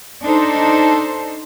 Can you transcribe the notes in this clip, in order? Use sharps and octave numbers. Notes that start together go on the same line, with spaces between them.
D4 D#4 A4 C5